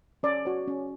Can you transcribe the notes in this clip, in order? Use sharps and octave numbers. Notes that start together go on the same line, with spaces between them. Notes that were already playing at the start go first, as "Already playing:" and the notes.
C#4 D5
F#4 C#5
C#4